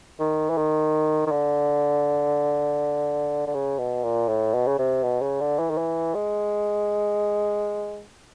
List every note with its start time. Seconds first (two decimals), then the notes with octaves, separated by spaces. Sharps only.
0.20 D#3
0.50 E3
0.57 D#3
1.26 D#3
1.31 D3
3.47 D3
3.54 C#3
3.79 B2
4.04 A#2
4.28 A2
4.54 B2
4.67 C#3
4.78 C3
5.03 B2
5.21 C#3
5.40 D3
5.59 E3
5.70 D#3
5.78 E3
6.15 G#3